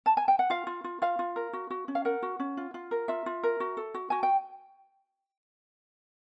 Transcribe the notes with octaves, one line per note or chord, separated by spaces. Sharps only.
A5
G#5
G5
F#5
F4 F5
F4
F4
F4 F5
F4
A#4
F#4
F#4
C#4
F5
A#4 F#5
F#4
C#4
F4
F4
A#4
F4 E5
F4
A#4
F#4
A4
F#4
F#4 G#5
G5